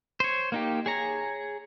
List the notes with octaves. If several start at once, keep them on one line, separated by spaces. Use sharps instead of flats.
C5 C#5
A#3 D#4 G4
G#4 C#5 A#5